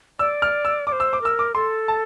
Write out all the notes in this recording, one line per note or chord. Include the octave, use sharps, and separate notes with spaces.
D5 E6
F6
E6
D5 D6
C5
E6
D6
A#4 E6
D6
A4 C6
A5